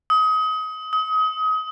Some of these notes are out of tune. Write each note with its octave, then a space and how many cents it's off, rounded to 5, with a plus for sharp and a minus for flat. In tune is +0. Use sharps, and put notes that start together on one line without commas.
D#6 +30
D#6 +35